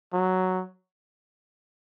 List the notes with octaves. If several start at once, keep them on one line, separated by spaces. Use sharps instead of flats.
F#3